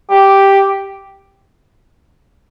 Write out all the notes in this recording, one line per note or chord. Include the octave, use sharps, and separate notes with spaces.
G4